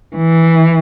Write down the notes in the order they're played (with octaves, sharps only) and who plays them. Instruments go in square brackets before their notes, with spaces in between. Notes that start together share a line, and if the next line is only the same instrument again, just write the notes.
[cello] E3